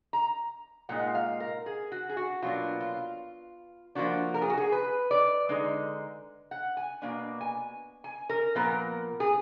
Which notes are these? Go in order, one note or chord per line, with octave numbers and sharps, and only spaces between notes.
A#5
A#2 G#3 D#4 F#5
F5
A#4
G#4
F#4
G#4
F#4
B2 F#3 A#3 D4 F4
F4
F3 A#3 D4 F#4
A#4
G#4
F#4
G#4
B4
D5
D3 G#3 D#4
F#5
G#5
B2 A#3 D4
G#5
G#5
A#4
A#2 F3 B3 A#4
G#4